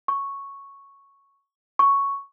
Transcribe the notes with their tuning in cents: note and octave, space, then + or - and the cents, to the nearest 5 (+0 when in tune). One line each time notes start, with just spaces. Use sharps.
C#6 -5
C#6 +0